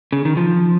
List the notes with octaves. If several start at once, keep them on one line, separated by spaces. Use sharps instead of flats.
C#3
D#3
F3